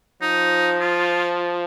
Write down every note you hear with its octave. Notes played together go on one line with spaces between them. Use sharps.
F3 D#4
F4